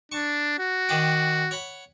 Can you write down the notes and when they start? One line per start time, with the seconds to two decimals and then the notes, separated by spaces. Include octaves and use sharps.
0.12 D4 A5 C#6
0.59 F#4
0.89 D#3 D4 G5
1.51 C#5 F#5 B5